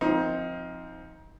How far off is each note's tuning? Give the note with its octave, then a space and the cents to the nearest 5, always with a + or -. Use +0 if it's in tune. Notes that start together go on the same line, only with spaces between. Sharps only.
F3 +0 C4 +0 D#4 +25